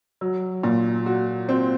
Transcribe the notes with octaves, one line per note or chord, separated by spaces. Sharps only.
F#3
A#2
F#4
C4